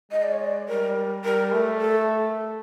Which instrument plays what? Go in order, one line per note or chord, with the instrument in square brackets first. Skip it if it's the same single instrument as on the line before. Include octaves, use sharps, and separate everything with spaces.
[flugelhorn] G#3 [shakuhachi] D#5
[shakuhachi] D5
C#5
D5
[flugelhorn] G3 [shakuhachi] A#4
[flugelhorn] G3 [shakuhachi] A#4
[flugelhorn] A3
[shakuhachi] A4